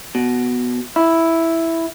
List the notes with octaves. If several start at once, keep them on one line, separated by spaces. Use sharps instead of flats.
B2
E4